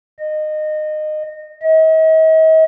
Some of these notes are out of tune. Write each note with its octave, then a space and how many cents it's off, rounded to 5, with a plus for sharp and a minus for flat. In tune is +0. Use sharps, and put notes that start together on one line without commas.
D#5 -20
D#5 +45